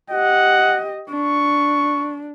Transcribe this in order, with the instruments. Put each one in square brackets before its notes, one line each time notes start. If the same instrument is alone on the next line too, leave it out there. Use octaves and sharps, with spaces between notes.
[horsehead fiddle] G4 D#5 [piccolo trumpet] F#5
[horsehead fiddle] D4 [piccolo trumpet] C#6